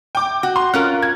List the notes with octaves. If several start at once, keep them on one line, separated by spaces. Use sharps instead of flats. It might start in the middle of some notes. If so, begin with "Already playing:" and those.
G5 D6
F#4
C6
C#4 F4 A#4 F#6
G#6